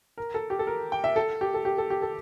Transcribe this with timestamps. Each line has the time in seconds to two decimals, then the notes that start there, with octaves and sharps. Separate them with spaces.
0.18 A#4
0.34 A4
0.50 G4
0.59 A4
0.67 A#4
0.92 G5
1.04 E5
1.16 A4
1.41 G4
1.54 A4
1.65 G4
1.78 A4
1.90 G4
2.02 A4